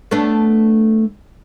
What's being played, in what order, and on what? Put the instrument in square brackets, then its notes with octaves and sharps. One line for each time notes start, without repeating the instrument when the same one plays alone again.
[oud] A3 B3 D4